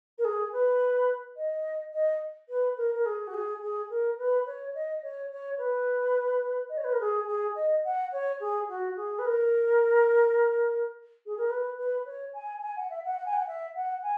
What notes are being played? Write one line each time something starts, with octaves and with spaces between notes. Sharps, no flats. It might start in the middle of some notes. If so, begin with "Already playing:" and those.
A#4
G#4
B4
D#5
D#5
B4
A#4
A#4
G#4
F#4
G#4
G#4
A#4
B4
C#5
D#5
C#5
C#5
B4
D#5
C#5
B4
A#4
G#4
G#4
D#5
F#5
C#5
G#4
F#4
G#4
B4
A#4
G#4
A#4
B4
B4
C#5
G#5
G#5
F#5
E5
F#5
F#5
G#5
F#5
E5
F#5
G#5